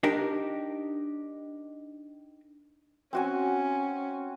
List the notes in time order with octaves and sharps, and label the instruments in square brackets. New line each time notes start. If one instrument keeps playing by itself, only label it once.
[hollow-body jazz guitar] D4 D#4 G4 A#4
[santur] C4 F#4 G#5 [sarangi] C#4